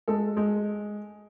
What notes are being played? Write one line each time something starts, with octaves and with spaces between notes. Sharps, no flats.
G#3 A4
G#3